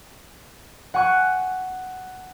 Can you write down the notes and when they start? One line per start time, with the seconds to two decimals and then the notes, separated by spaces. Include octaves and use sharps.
0.94 F#5 G#5 C#6 F#6